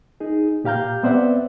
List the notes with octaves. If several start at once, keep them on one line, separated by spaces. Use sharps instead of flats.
D#4 G#4
A#2 G4 F5 A#5 G6
B3 C4 C5 D5 E5 F#5